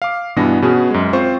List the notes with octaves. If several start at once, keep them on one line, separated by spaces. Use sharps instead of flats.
F5 D6
G2 B2 E3 B3 D4 A#6
B2 B3 C#4 F#4 G#4
F#2 G#3
C4 F4 C5 C#6